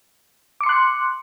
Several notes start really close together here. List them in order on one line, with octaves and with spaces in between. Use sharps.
D6 C#7 C6 F#6